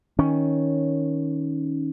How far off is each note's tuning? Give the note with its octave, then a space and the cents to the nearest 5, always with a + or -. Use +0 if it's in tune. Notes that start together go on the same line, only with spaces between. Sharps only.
D#3 +15 C#4 +0